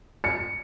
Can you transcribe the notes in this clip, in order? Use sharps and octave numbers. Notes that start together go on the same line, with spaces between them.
C#7